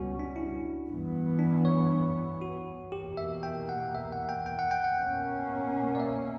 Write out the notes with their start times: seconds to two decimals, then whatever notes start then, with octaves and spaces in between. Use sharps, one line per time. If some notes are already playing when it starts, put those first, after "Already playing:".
Already playing: C#2 B2 G3 C#4 F#4
0.19 D4
0.36 E4
0.88 G2 E3 B3
1.39 D4
1.65 C#5
2.41 F#4
2.92 E2 B2 A#3 G4
3.17 E5
3.43 G5
3.69 F#5
3.95 E5
4.12 F#5
4.29 G5
4.46 G5
4.59 F#5
4.71 G5
4.84 F#5
4.97 B2 A#3 C#4
5.95 D5
6.00 E5